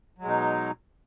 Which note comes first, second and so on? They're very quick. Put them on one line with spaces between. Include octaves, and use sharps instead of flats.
F#3 G#3 B2 D#4